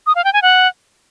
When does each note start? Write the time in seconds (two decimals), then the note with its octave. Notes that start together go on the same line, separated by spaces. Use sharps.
0.07 D#6
0.15 F5
0.24 G5
0.33 G#5
0.42 F#5